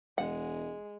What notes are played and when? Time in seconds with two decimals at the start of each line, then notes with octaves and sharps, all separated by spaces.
0.18 E1 G#3 F#5